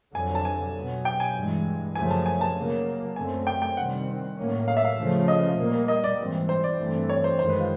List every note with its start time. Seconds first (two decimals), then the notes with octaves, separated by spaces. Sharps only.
0.14 F2 D3 F#3 G#5
0.35 A5
0.45 G#5
0.75 B2 F#3 B3
1.05 G5
1.20 G#5
1.36 G2 E3 G#3
1.96 F#2 C#3 F3 A3 G#5
2.10 A5
2.26 G#5
2.41 A5
2.56 C#3 F#3 A#3
3.16 F#2 D3 F#3 A3 C4 G#5
3.47 G5
3.62 G5
3.77 C3 D#3 G3 C4 F#5
4.37 A2 F#3 A#3 C#4
4.68 F5
4.77 E5
4.85 F5
4.98 C#3 F3 A3 C#4
5.28 D#5
5.58 A#2 G3 A#3
5.88 D#5
6.04 D5
6.18 G#2 E3 G3 C4
6.49 C5
6.64 D5
6.78 G2 E3 A3 C4
7.10 C#5
7.24 C5
7.39 F#2 D#3 G#3 C5
7.49 B4
7.60 F4